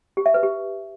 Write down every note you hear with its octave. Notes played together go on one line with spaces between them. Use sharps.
G4
E5
B4
G4